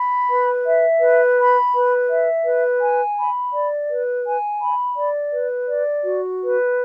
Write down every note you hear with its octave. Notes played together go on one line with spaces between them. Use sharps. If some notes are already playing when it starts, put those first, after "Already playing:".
Already playing: B5
B4
E5
B4
B5
B4
E5
B4
G#5
B5
D5
B4
G#5
B5
D5
B4
D5
F#4
B4